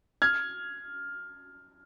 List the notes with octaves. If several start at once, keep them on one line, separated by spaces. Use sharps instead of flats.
F6 G#6